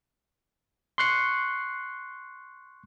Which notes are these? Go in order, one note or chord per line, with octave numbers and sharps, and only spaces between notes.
C6 C#6 F#6 C7 C#7